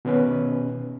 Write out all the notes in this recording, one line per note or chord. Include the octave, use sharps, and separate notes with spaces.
B2 D#3 B3 C#4 B4